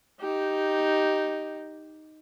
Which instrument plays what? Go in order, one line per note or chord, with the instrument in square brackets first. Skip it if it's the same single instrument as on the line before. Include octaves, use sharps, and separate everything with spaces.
[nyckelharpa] D#4 G4